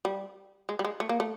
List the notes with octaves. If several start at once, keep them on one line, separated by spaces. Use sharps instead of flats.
G3
G#3
G3
G#3
A3
A#3
A3